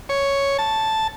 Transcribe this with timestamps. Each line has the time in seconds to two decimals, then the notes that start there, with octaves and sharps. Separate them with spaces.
0.09 C#5
0.58 A5